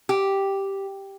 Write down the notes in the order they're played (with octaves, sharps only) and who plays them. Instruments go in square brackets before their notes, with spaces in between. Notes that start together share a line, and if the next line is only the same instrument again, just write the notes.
[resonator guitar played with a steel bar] G4